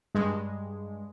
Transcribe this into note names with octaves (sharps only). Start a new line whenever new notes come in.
G2 G#3